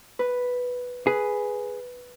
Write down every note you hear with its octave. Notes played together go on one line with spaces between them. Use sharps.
B4
G#4 B4